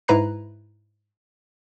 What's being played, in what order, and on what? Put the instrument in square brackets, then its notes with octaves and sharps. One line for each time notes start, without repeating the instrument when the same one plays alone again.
[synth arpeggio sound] G#2 E4 B4 A#5 F#6 C7